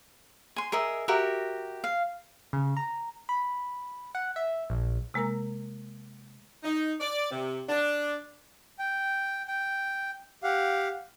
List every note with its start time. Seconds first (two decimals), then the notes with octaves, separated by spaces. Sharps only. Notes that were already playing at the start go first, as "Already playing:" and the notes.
0.56 G#5 C6
0.72 G#4 A#4 D#5 E5
1.08 F#4 G4 A#4 E5
1.84 F5
2.53 C#3
2.77 A#5
3.29 B5
4.15 F#5
4.36 E5
4.70 A#1
5.14 C3 G#3 A#3 A#4 A#5
6.64 D#4
7.00 D5
7.31 C3
7.68 D4
8.79 G5
9.48 G5
10.43 G4 F5 F#5